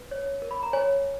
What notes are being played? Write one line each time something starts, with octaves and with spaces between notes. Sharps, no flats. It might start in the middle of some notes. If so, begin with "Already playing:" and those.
Already playing: B4
C#5
A#4
B5
A#5
C#5 G#5